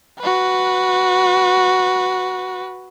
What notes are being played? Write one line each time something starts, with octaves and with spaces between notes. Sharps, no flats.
F#4 B4